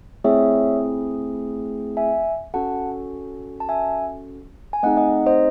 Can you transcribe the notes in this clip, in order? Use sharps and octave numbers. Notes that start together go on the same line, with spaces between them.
A3 C4 E4 G#4 C#5 E5
E5 G#5
C#4 F#4 A4 F#5 A5
A5
E5 G#5
G#5
A3 C4 D#4 G#4 D#5 F#5
D#5 F#5
C5 D#5